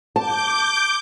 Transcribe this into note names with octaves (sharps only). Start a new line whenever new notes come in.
A5 D6 G6